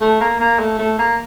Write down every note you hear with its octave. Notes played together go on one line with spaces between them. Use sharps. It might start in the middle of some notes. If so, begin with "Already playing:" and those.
A3
A#3
A#3
A3
A3
A#3